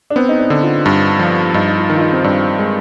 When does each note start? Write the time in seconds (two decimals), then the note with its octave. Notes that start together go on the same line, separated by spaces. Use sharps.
0.10 D4
0.16 B3 C4
0.29 D#4
0.39 D4
0.50 D3
0.62 F4
0.86 G2
1.19 F3
1.54 G2 D#4
1.67 D#4
1.78 F4
1.90 D#3
1.96 F4
2.01 D#4
2.12 C4
2.24 G2 D4
2.59 G#3